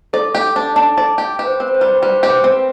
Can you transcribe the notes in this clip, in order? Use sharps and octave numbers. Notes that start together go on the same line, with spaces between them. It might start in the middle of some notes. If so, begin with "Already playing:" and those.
A4 D5
G4
D4
D4
D5
G4
G4 B4
C5
B4
C4 C5
B4
C5
G3 B4
C5
B4
G3 C5
B4
C5
G4 B4
C5
B4
C4 C5
B4